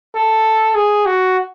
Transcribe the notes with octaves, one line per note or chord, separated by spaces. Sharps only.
A4
G#4
F#4